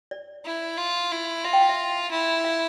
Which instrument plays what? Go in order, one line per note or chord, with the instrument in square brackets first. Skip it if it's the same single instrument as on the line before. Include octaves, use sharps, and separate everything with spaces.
[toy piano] D5
[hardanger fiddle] E4
F4
E4
[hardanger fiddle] F4 [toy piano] E5
[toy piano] G5
F5
E5
[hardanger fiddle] E4
[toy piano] F5